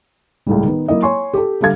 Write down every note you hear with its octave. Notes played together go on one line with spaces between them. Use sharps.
C#2 A2 G3
D#3 B3
F#3 A#3 E4 D#5
C#5 G#5 C6 C#6
G4 A4
D3 G3 G4 A4 F5 G#6